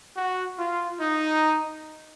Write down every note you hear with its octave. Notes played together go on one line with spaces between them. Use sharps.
F#4
F4
D#4